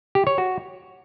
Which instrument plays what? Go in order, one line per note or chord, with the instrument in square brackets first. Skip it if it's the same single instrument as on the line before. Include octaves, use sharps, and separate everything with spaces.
[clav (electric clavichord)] G4
C#5
F#4